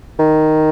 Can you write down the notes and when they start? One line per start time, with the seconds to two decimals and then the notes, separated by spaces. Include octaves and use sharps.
0.19 D#3